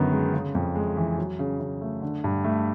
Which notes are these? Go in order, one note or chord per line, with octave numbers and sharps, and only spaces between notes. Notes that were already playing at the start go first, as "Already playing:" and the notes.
Already playing: F#2 D3 D#3 B3 D#4
G#3
C#3
F2
G#3
E3
F#3
C#3
C#3
A3
D3
G2
A3